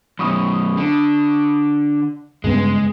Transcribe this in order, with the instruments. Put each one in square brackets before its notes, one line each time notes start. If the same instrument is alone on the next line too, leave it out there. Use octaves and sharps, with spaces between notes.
[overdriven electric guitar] F#2 B2 [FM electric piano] B5 C#6 D#6
[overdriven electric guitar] D3
[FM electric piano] G2 C#3 B3 [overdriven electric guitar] G#3